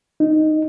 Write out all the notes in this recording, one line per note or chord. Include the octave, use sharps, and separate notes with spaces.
D#4